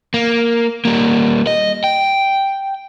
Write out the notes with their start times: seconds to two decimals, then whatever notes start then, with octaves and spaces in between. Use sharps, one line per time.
0.14 A#3
0.85 G3 A#3
1.47 D#5
1.84 G5